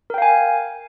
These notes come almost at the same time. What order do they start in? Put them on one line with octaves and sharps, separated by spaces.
A#4 G5 F5 G#5